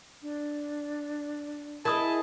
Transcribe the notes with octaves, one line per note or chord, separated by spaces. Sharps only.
D4
E4 G#4 A#4 D#5 A5 D#6